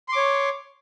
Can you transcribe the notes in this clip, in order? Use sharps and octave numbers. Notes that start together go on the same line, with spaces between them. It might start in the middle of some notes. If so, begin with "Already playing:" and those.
C#5 C6 D6